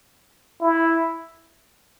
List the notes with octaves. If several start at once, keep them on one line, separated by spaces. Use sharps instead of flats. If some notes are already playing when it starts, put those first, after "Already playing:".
E4